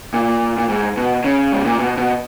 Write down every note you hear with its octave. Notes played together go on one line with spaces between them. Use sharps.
A#2
A#2
G#2
B2
C#3
G#2
A#2
B2
B2